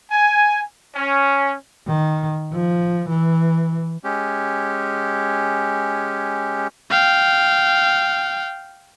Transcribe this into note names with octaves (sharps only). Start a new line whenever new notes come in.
G#5
C#4
D#3
F3
E3
G#3 C#4 G4
F5 G5